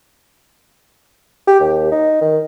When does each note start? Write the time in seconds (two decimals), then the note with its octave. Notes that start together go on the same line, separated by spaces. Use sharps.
1.47 G4
1.60 D#2
1.91 D#4
2.21 D#3